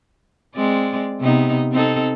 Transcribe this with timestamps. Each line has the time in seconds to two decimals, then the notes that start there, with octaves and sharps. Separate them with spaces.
0.55 G#3 C4 D5
1.20 C3 B3 D#4
1.72 C4 D#4 A4